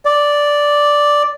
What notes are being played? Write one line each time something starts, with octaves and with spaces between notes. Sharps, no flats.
D5